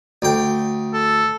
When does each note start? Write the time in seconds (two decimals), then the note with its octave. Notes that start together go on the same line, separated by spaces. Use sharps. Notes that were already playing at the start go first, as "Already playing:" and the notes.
0.22 D2 G5
0.93 A4